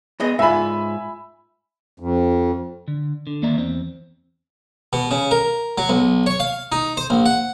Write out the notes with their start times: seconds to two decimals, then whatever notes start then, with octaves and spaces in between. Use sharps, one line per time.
0.20 B3 G#4 D#5
0.39 G#2 F4 E5 G#5 B5
2.00 F2
2.88 D3
3.27 D3
3.42 D#2 A#3 D5 E5 A#5
3.58 E2 C4
4.93 B2
5.11 C#3
5.31 A#4
5.78 F#3
5.89 B1
6.26 C#5
6.40 F5
6.72 D#4
6.97 C5
7.10 A#1
7.26 F#5